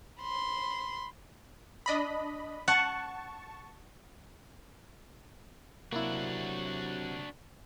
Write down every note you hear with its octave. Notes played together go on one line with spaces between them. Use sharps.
B5 C6
D4 D#5 B5
F#5 A5 C#6
C3 F#3 A#3 D4 E4 F#4